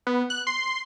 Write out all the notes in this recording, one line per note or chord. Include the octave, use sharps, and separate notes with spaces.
B3
F#6
C6